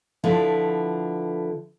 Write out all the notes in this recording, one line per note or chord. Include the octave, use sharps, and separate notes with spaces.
D3 F3 E4 B4